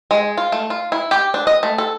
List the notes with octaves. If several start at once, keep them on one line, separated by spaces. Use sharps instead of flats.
G#3
F4
A3
F4
E4
G4
D4
D#5
A3
A4